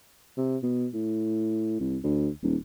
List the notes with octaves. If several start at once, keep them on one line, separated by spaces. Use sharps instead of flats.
C3
B2
A2
C2
D2
D#1